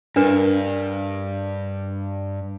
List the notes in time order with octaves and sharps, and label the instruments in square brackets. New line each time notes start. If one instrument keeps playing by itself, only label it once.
[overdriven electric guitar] G2 [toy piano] D4 A#4 B4